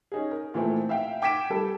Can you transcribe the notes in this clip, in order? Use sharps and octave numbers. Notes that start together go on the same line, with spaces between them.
C#4 D#4 G#4
A#4
A#2 E3 F3 A3 C4
E5 F5 G5
G5 D6 G#6 B6 D7 E7
G3 A4